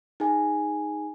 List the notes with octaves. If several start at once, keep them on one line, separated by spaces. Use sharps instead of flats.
D#4 G#4 G#5